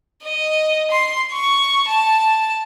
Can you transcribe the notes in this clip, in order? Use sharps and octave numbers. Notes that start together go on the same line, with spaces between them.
D#5
C6
C#6
A5